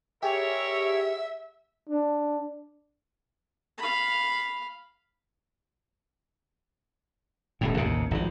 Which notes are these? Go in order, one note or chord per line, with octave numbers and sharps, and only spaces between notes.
E4 G4 G#4 A#4 C#5 E5
D4
F5 B5
D#1 C#2 A2
A1 D#2 C3
G#1 F3